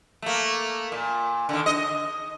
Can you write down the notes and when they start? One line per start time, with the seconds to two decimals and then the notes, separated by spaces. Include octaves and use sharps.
0.22 A3 A#3
0.92 A#2
1.49 D3 D#3
1.66 D#5